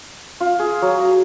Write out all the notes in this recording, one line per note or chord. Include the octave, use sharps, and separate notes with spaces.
F4
G#4
F#3
A#5